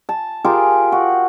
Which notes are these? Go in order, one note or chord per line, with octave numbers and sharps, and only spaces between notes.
A5
F4 G4 G#4 A#4
F#4